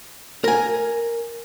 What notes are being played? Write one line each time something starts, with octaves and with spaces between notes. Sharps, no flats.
A#4 G#5